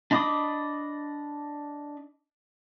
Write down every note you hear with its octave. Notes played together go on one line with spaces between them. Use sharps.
D4 D#5 B5 D6 D#6